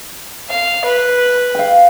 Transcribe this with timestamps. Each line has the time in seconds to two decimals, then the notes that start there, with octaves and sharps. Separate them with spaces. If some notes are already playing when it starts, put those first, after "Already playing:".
0.49 F5
0.85 B4
1.55 F5 G5